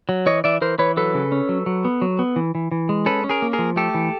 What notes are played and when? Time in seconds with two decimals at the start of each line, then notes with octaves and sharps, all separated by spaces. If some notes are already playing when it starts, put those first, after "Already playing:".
0.09 F#3
0.26 E3 C#5 D#5
0.44 E3 D5 E5
0.61 E3 A#4 C5
0.78 E3 B4 C#5
0.97 F#3 A4 B4
1.14 C#3
1.32 C#4
1.49 F#3
1.66 F#3
1.85 B3
2.02 F#3
2.19 B3
2.36 E3
2.55 E3
2.72 E3
2.89 G#3
3.06 C#4 A4 B4
3.24 C#4
3.29 G#4 A#4
3.42 A#3
3.53 G#4 A#4
3.59 F3
3.76 A3 G4 A4
3.95 E3